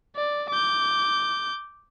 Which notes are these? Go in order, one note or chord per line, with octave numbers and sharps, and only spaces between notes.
D5
D6 G6